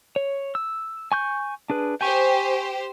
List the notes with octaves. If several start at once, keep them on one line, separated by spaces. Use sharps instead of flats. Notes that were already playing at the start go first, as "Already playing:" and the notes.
C#5
E6
G#5 C#6 G6
D4 G#4 B4
G4 C5 G5 G#5 C#6